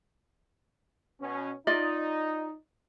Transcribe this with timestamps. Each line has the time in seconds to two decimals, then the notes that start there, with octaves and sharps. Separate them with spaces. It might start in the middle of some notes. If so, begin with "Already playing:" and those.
1.20 B2 C#4
1.67 D#4 F4 D5 D#5